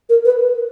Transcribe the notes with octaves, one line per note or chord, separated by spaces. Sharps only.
A#4
B4